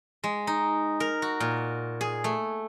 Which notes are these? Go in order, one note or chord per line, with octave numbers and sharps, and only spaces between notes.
G#3
D#4
A#4
F#4
A#2
G#4
A3